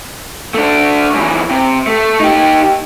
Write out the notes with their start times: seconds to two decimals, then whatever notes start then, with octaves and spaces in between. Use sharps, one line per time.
0.54 A3 D4
1.15 F#2 E3
1.51 C3
1.87 A3
2.20 D#4 G4